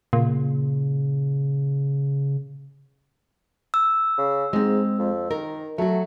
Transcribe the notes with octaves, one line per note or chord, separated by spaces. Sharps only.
A#2 C#3
E6
C#3
G#2 G#3 C4
F2
D#3 A#4
F#3 A3 F#4